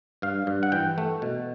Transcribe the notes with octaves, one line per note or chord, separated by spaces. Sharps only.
G2 F5
G2
F#5
E3 G5
A3
B2